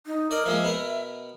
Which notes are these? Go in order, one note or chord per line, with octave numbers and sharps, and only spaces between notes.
D#4
A#4 D5 D#5
F3 G#3 A#3 E5
B2 B3 A#4